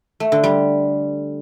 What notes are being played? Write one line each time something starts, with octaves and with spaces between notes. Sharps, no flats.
A3
D3
G3